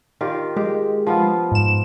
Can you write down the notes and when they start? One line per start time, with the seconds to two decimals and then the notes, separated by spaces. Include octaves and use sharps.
0.21 D#3 F4 G4
0.56 G#3 G4
1.07 F3 B3 F4
1.52 G#2 E7